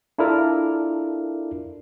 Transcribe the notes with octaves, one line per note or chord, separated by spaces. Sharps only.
D4 E4 F4 A4 A#4 D5